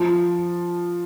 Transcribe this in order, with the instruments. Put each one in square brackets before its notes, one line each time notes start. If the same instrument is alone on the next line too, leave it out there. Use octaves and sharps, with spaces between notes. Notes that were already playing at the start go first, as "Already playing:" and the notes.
Already playing: [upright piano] F3